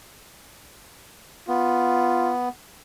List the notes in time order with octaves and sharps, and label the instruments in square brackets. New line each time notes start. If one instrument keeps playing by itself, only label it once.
[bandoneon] B3 [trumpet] F4